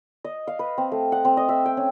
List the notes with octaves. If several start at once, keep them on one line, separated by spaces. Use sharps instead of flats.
D#5
F5
B4
C4
A3
F#5
C4
D#5
E5
G5
C#4